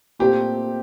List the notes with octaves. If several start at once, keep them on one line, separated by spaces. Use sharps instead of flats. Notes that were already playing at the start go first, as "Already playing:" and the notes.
A#2 A3 C4 G4